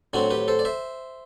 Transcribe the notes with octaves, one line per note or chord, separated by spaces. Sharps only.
A2 F#3 C4 D4 F#4
G4 B4
A4 C5
D5
C5 E5